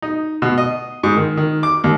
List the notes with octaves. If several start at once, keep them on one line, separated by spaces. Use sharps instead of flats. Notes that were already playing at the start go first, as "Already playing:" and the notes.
D#4
B2
D#5
G#2
D#3
D#3
D6
D#2